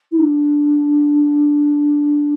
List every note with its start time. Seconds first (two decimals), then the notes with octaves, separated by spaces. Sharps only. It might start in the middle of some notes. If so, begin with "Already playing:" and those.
0.11 E4
0.19 D4